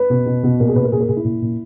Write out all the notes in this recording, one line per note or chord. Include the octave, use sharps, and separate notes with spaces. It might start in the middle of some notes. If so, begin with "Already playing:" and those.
Already playing: B4
B2
B2
B2
A#2 A#4
G#4
A#2 B4
A#4
A#2 G#4
A#4
A#2 G#4
E4
A#2
A#2